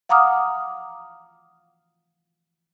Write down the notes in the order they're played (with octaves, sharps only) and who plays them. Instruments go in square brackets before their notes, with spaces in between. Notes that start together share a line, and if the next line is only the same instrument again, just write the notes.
[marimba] F5 F#5 A#5 D6 D#6 F6